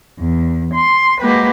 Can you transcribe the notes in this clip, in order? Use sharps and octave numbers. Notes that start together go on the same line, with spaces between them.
E2
C6
G#3 A#3 F#4 G4 B4